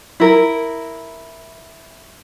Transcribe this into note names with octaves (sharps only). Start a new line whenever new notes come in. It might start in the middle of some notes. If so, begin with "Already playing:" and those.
E4 A#4